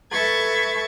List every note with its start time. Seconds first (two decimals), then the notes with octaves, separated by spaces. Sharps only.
0.12 A4 B4 E5 C#6 G#6 A6